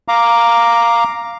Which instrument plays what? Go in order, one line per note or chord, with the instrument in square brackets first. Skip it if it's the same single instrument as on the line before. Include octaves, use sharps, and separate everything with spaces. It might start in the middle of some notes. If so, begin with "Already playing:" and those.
[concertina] F5 A#5 D6